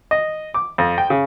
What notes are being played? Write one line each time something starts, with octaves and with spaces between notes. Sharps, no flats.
D#5
D6
F2
G5
C#3